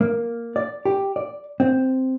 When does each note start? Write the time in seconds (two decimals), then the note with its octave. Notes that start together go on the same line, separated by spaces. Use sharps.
0.01 A#3
0.56 D5
0.85 G4
1.16 D5
1.60 C4